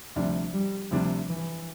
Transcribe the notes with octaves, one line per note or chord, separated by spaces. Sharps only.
D2 C3 F3 G3 D4
G3
D2 C3 F3 G3 D4
E3